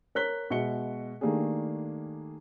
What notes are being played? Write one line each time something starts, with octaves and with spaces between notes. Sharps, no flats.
A#4 C#5 F#6 B6 G7
B2 G#3 E5 C#7 G7
D#3 A3 A#3 D4 G4 G#4